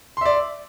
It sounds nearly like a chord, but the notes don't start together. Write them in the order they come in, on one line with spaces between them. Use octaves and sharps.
C6 E5 D5